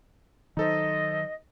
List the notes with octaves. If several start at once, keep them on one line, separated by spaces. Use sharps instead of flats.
D#3 F#3 D#4 A4 C5 D#5